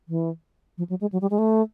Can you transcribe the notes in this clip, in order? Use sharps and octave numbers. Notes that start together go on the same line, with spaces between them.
E3
F3
F#3
G#3
F#3
G3
G#3
A3